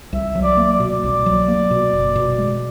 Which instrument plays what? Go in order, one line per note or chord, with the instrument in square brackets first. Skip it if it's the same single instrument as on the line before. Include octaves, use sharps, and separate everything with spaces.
[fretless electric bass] C2 [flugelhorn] E5
[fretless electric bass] F#3
[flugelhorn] D5
[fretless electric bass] A#3
[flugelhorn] D5
[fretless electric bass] B2
C2
F#3
A#3
B2
F#1
B2
G#3